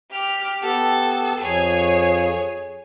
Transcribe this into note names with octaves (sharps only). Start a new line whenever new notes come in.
G4 F6
B3 G4 A4 F#5
F2 G#4 C#5